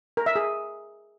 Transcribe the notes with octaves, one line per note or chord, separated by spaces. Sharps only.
A#4
E5
G#4